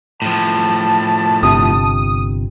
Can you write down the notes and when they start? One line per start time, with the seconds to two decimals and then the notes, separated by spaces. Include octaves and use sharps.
0.22 A2 F3 A5
1.43 G1 C3 D#6